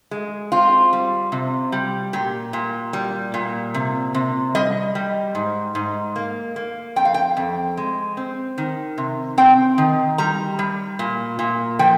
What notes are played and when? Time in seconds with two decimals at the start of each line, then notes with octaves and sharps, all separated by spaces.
0.11 G#3
0.52 C4 F4
0.93 G3
1.32 C3
1.72 G3
2.13 A#2 G4
2.53 A#2
2.93 G3
3.34 A#2
3.74 C3
4.14 C3
4.55 G3 D#5
4.95 G3
5.35 G#2
5.75 G#2
6.16 A#3
6.56 A#3
6.96 F2 G5
7.05 F5
7.14 G5
7.37 F2
7.77 G#3
8.17 C4
8.58 D#3
8.98 C3
9.38 C4 G5
9.78 D#3
10.18 G3 A#5
10.59 G3
10.99 A#2
11.39 A#2
11.79 F3 G5